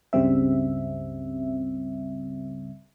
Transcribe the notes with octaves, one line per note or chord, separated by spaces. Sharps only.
C#2 G2 C#3 G3 C4 E5